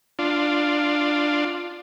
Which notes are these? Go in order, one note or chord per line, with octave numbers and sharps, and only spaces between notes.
D4 F4